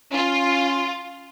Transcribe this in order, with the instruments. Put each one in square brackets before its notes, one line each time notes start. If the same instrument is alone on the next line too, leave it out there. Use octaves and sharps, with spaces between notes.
[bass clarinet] C#4 [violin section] F4